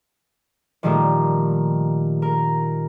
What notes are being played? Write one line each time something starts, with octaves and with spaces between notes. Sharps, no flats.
A#2 D#3 F3 G3 A3 A#3
A#4